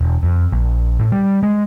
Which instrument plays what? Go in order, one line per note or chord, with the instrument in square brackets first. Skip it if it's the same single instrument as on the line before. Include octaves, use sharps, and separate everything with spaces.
[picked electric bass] E1
F2
A#1
A2
G3
G#3